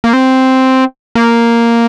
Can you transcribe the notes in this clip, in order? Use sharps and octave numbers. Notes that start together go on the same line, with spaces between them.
A#3
C4
A#3